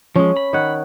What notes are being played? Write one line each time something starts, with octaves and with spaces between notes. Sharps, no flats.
F3 G#3 C#4
B5
D#3 C#5 F#5